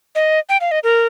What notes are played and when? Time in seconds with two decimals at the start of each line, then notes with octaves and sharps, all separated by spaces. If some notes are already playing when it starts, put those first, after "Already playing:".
0.15 D#5
0.49 G5
0.61 F5
0.71 D#5
0.84 A#4